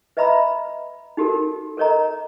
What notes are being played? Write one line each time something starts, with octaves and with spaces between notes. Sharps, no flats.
B4 D#5 E5 A#5 B5 E6
D#4 F#4 G4 A4 A#4
A4 A#4 C#5 D#5 A#5